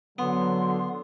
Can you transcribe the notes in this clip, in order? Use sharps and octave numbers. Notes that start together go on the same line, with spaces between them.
D3 F#3 B3 C6